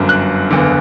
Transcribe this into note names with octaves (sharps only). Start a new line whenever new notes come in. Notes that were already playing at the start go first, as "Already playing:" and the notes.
Already playing: G1 F#2 D3
F#6
F#1 E2 D3